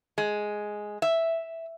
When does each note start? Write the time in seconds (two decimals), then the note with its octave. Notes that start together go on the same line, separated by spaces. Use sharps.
0.18 G#3
1.02 E5